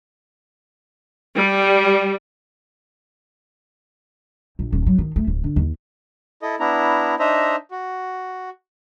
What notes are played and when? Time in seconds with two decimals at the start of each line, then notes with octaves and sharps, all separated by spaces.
1.35 G3
4.59 A#1
4.73 D#1
4.87 F#3
4.98 D#3
5.16 A3
5.27 D1
5.44 D3
5.56 D#2
6.42 E4 A4 D#5
6.60 B3 D4 E4 A#5
7.19 D4 D#4 C5 D#5 E5 A#5
7.71 F#4